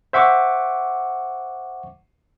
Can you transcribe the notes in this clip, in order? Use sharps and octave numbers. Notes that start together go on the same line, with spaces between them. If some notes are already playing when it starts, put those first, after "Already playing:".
C5 E5 F#5 C#6 D6